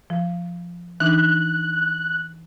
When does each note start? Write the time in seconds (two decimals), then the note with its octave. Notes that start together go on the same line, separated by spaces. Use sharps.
0.10 F3
1.00 E3 D4 D#4 F#6